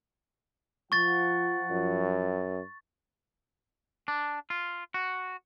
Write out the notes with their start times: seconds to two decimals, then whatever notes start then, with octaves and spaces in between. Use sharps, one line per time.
0.92 F3 F#5 C#6 A6
1.71 F#2
4.08 D4
4.50 F4
4.94 F#4